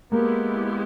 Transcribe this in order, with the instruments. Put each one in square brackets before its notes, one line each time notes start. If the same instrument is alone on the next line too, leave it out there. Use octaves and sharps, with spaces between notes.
[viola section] G#3 B3 E4 G4 [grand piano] A#3